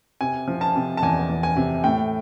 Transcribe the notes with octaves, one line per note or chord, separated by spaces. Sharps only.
C3 G#5
F3
A5
C3
A5
E2 G#5
E2
G#5
C3
A2 G5